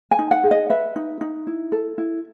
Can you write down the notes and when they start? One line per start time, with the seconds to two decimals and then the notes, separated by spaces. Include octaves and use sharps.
0.11 G#5
0.19 D#4
0.31 F#5
0.44 G#4
0.51 D#5
0.70 B4 E5
0.96 D#4
1.21 D#4
1.47 E4
1.72 A4
1.98 E4